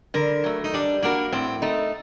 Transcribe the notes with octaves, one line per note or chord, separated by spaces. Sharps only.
D3 A#4
F#3 A3
D#4
G3 D4
A#3 D4 F#4 A#4
A2 C4
A3 D#4